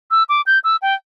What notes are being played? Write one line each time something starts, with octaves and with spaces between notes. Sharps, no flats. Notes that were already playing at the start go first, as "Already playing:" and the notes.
E6
D6
G6
E6
G5